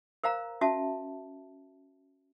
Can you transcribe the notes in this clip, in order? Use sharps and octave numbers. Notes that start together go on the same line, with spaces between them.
A#4 C5 F5 A#5
C#4 F#4 E5 A5